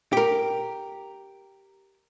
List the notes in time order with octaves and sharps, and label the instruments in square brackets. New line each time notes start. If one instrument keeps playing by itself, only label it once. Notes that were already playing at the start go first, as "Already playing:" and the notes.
[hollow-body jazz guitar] G4 A#4